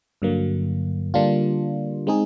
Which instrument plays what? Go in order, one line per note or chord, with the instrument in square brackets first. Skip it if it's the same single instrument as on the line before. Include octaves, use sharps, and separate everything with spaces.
[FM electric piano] G2 D3 F#3 A#3
D3 G3 A#3 D4 F4
G#3 C4 D#4 G#4